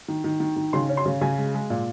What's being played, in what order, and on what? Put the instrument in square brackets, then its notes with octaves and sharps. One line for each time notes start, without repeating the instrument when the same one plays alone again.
[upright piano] D#3
D#3
D#3
D#3
C#3 C6
C#4
C6
C#3
C#3 G#5
G#3
G#3
A#2